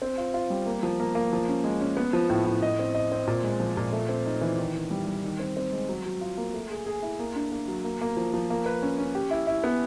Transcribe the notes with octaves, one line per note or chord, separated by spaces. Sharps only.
C4
F4
F4
G3
A#3
F3
A#3
A#3
F3
C#4
G#3
C#4
B3
F3
A2
A2
D#5
C4
D#5
C4
A#2
G#3
F3
A#2
A3
C4
D#4
E3
D#3
D#3
G3
G3
D#3
C4
C4
G#3
F#3
F#3
F4
A#3
A3
G#4
G#4
E4
A#3
D4
A#3
F#3
A#3
A#3
F3
F3
A#3
B4
C#4
C#4
G4
E4
E4
B3